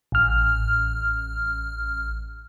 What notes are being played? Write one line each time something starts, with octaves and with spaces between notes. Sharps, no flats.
A1 F6